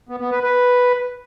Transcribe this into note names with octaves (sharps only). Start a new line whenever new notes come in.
B3
B3
B4
B4